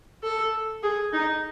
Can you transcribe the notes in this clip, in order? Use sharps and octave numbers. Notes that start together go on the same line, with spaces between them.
A4
G#4
D#4